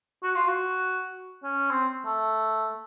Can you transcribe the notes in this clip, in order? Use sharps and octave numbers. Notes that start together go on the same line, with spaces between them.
F#4
F4
F#4
C#4
C4
A3